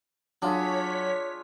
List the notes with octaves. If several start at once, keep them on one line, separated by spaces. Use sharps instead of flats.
F#3 D4 F4 G#4 C#5 B6